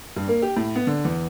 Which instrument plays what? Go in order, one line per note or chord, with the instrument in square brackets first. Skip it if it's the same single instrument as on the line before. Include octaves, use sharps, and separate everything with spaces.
[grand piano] G2
A#3
G4
A2
B3
D3
E2